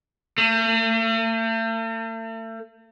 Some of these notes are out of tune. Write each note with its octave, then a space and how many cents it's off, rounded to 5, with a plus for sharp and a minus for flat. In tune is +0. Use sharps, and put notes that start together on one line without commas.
A3 +40